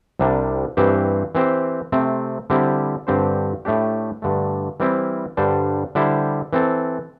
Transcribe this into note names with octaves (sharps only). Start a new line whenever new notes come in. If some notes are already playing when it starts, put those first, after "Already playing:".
C2 C3 G3 D4
G2 E3 C4 G4 C5
E3 C4 G4 C5
C3 A3 C4
D3 G3 C4 E4 G4
G2 D3 C4 G4 C5
A2 A3 D4 G4
G2 D3 A3
E3 G3 C4 E4
G2 D3 G3 D4 C5
D3 G3 E4 G4 C5
E3 C4 A4